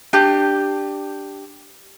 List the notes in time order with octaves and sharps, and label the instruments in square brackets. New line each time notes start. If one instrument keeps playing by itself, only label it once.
[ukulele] D4 G4